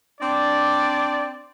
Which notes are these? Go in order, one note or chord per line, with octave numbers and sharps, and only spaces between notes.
C4 D4 D5